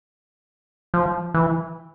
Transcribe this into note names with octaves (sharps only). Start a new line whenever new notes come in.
F3
E3